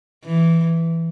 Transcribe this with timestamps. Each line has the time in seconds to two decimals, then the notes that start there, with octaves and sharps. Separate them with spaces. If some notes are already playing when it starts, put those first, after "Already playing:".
0.25 E3